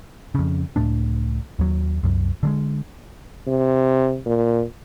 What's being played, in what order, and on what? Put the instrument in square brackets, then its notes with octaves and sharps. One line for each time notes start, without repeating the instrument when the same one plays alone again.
[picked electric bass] F2 C#3
C#2 A2 A3 D4
D#2 F#3
C2 F#2
D3 G3 G#3
[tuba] C3
A#2